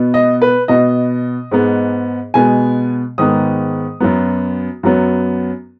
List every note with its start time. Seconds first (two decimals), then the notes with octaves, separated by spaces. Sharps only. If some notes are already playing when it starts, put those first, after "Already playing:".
Already playing: B2 B3
0.14 D#5
0.42 B4
0.68 B2 B3 D#5
1.51 G#2 G#3 B3
2.34 B2 G#3 B3 G#5
3.18 G#2 D#3 G#3 B3 D#6
4.00 F#2 F#3 B3
4.83 F#2 F#3 B3